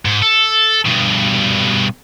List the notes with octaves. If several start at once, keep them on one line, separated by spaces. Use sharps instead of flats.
G#2
A4
G2 B2